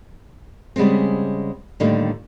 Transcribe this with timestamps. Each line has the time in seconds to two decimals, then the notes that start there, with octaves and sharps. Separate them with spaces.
0.76 C#3 G3 G#3 B3 C4
1.80 A2 D3 D#3 G3 A#3 D#4